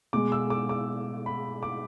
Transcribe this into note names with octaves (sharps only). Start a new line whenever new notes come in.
B2 G#3 D6
E6
D6
D6
B5
D6